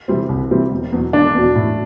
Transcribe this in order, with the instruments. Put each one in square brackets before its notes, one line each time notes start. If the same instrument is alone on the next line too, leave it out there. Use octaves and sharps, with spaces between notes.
[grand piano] C3 E3 G3 C4
C2
C3 E3 G3 C4
E1
E2 B2 F#3
[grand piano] E1 [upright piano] D4
[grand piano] E2 B2 F#3
A2